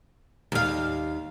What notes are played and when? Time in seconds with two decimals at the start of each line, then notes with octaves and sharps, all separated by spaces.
0.52 D#2 F5